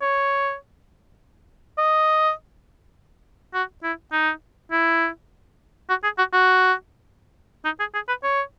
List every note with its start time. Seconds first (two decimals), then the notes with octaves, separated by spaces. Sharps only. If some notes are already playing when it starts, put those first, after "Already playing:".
0.02 C#5
1.78 D#5
3.54 F#4
3.83 E4
4.12 D#4
4.72 E4
5.89 F#4
6.04 G#4
6.18 F#4
6.33 F#4
7.65 D#4
7.79 G#4
7.94 G#4
8.08 B4
8.23 C#5